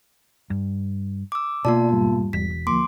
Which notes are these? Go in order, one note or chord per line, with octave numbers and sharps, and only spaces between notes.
G2
D6 E6
B2 A#3 F4 D5 A5
E2 G#2 G3
E1 B6
D2 F3 A#3 C6 D6 D7